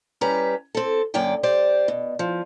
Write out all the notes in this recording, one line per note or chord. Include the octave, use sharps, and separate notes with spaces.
G3 C#4 G4 B4 A#5
C4 A4
F#2 D3 A#3 D5 G5
G3 C5 D5
B2
F3